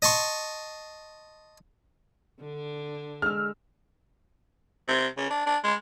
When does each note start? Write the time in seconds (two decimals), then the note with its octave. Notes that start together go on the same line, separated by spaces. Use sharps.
0.02 D#5 A5 C6 C#6
2.40 D3 D4
3.22 G#3 E6 F6
4.88 C3
5.17 C#3
5.30 D4
5.46 D4
5.64 G#3